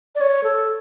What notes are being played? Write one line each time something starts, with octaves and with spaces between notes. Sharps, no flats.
D5
C#5
A4